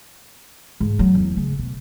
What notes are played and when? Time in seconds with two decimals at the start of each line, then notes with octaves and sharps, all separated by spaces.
0.80 G#2
0.99 F#3
1.15 E2
1.37 C#3
1.59 B2